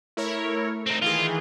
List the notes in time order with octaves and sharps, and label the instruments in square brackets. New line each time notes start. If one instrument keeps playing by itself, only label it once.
[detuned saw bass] A3 [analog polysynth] E4 A#4 C#5
[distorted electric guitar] C4 D#4
[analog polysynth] D#3 E3 G#4 [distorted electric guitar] F4